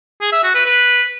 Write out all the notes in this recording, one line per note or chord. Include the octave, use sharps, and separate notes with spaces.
G#4
E5
F#4
B4
B4